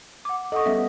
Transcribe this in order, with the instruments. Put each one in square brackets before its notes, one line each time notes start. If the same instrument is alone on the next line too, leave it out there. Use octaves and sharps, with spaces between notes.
[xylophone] F#5 D6
[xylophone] A4 F#5 C#6 [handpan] D#5
[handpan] G3 B3 C#4 [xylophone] E5